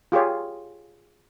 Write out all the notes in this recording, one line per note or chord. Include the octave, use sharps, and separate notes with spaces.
F4 G4 G#4 C#5